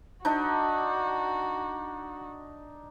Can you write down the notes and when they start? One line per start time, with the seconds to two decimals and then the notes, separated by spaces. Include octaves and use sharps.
0.25 D4 D#4 F#4